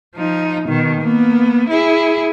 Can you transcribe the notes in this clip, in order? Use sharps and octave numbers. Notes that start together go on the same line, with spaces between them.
F3 D#4
B2 D#3
A#3 B3
E4 G#4